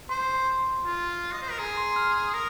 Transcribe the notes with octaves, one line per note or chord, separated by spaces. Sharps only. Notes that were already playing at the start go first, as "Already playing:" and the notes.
C5 C6
F4
D#5
C5
A#4
G#4 A#5
C6
F6
A#4 D#6